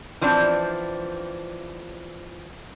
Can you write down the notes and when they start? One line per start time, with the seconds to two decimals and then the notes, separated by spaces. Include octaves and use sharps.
0.21 E3 F3 C4 D4